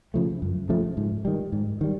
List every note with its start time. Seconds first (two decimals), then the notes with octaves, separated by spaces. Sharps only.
0.14 C#3 F3 A3
0.42 F#2
0.69 C#3 F3 A3
0.97 G#2
1.25 D#3 G3
1.52 G#2
1.81 D#3 G3